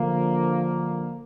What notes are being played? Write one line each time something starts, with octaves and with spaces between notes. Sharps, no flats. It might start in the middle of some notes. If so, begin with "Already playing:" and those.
Already playing: D3 F3 A#3